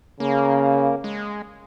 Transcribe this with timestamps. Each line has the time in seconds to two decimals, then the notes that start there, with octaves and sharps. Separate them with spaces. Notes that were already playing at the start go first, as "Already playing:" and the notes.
0.20 C#3 A#3
1.04 G#3